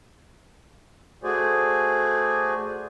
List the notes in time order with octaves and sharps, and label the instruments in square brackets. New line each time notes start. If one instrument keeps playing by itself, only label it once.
[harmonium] A3 F#4 G#4 C5 D5 G#5